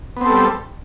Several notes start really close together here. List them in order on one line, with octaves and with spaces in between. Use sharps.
B3 C4 A4 G3